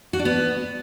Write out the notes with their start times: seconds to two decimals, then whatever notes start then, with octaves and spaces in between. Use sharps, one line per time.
0.13 F#4
0.19 D4
0.25 B3